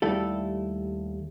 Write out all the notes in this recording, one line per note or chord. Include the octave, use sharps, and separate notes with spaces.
D#2 G3 A3 E4 A4